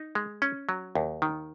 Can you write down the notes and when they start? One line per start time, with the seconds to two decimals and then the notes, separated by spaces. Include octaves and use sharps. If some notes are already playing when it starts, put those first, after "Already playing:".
Already playing: D#4
0.15 G#3
0.42 C#4
0.69 F#3
0.95 D#2
1.22 D#3